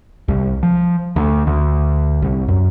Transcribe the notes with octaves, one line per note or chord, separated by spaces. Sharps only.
C2
F3
D2
D2
C2
F#2